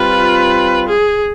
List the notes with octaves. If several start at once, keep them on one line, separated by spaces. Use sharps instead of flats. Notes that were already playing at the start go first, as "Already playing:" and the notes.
Already playing: G3 C4 F4 B4
G#4